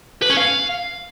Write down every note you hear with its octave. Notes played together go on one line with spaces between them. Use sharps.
B4
C#4
F5